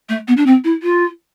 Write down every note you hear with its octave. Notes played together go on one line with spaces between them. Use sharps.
A3
B3
D4
C4
E4
F4